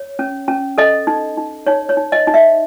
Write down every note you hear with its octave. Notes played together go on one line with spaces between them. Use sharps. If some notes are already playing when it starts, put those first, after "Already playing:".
Already playing: C#5
C#4
C#4
A4 D#5
D#4
D#4
D#4 C#5
C#5
D#4
D#5
D#4
E5